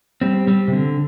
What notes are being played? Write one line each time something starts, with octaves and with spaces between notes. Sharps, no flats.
G3 C4
G3 C4
C3
D3